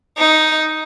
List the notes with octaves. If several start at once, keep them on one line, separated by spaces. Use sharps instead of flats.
D#4